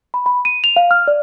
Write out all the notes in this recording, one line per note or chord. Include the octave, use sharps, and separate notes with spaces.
B5
B5
D#7
F7
F5
F6
D5